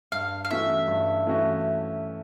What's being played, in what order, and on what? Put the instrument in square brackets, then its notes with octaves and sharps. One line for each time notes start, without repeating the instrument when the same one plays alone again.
[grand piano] G2 [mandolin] F5
[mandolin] F5
[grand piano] E3 A3 C#4 F#4 [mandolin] E5
[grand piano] G2
E3 A3 C#4 F#4